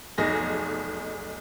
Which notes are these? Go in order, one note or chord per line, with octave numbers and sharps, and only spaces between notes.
F1 B1 D#4 G#4 A#6